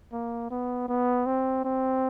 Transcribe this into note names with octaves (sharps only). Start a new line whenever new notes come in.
A#3
B3
B3
C4
C4